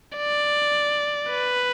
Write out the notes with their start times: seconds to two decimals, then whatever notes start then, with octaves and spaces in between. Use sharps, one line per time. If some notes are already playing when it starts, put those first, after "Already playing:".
0.17 D5
1.31 B4